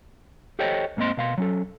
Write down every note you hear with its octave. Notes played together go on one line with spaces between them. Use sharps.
G4 A4 C5 C#5 D#5 G5
G#2 A#3 C4 D#5 C6
B2 F5 C6
F#3 C#4 A4